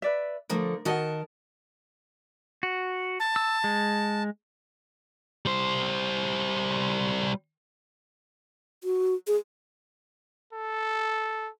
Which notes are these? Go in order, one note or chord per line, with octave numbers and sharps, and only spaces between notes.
B4 D5 E5
D3 F3 A3 A#4
D#3 F#4 A#4 D#5 F#5 A5
F#4
A5
E6
G#3
G3 C5
F#4
G#4
A4